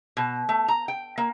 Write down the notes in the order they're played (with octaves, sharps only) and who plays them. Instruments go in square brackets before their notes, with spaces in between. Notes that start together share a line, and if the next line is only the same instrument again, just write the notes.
[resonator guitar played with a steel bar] B2
A3
A#5
G5
A#3